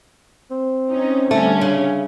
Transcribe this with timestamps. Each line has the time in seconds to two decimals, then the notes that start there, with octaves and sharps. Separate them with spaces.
0.51 C4
0.89 C#4 D#4
1.31 D3 G3 A3 C#4
1.61 C#3